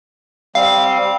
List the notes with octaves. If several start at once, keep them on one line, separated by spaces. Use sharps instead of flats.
G3 C4 F5